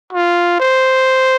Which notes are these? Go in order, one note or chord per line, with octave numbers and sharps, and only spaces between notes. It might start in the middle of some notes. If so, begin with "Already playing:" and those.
F4
C5